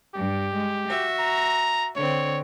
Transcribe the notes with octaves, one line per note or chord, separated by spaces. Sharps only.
G2 G4
G#3
F#4 E5
A#5
D3 C4 C#5